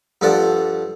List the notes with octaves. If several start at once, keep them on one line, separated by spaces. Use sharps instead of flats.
G2 F3 A4 D5 F#5 A5